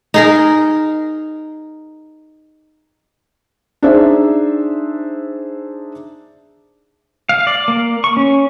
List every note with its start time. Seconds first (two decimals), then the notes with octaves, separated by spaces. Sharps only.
0.14 D#4 G#4 A#4
3.83 D4 D#4 G#4 C5 D5 E5
7.29 F5
7.47 D5
7.68 A#3
8.04 C#6
8.17 C#4